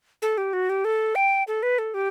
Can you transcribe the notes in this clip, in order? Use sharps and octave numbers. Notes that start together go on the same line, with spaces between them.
A4
G4
F#4
G4
A4
G5
A4
B4
A4
G4